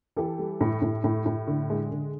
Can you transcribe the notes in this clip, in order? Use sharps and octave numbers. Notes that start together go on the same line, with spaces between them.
E3 G4 A4
G3
A2
A2
A2
A2
D3
G#3
D3